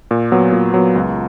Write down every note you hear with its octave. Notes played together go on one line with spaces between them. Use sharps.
A#2
F#3 B3
A#2
F#3 B3
C#2